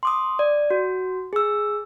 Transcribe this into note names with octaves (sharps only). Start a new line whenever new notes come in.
C6 D6 D#6
D5
F#4
G#4 E6